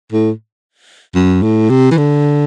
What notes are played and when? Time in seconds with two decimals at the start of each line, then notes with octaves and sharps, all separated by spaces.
0.12 A2
1.15 F#2
1.43 A2
1.70 C3
1.91 E3
1.97 D3